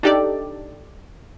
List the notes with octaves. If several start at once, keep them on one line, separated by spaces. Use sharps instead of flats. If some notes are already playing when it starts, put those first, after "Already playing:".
D4 D#4 G4 A4 D5